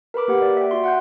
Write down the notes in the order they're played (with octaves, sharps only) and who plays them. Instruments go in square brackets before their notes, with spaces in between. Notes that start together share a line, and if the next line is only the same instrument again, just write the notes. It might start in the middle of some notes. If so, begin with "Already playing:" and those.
[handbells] A#4 B4 B5 D6
A#3 G4 F#5
D5
E5 G5
F#4 C6
F#5 F#6 G6